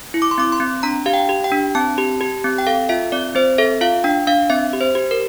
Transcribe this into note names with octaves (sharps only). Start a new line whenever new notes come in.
E4
D6
C6
C4 D6
C6
C4
D4 A#5
G4 F5
G5
G4
G5
D4
C4 A5
G4
G4
C4
G5
A4 F5
F4 E5
C4 D5
C4 C5
A4 E5
F4 F5
D4 G5
D4 F5
C4 E5
G4
C5
G4
A#4